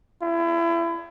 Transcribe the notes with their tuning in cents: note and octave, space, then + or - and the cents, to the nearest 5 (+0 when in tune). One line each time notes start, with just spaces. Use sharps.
E4 +30